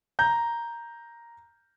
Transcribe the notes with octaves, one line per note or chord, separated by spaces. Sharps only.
A#5 G6